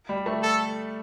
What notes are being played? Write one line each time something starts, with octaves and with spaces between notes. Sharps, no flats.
G3
A3
A4